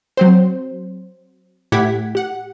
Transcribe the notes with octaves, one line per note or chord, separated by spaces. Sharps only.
F#3 C4 C5
A2 E4 G4 F#5 G#6 B6
G4 F#5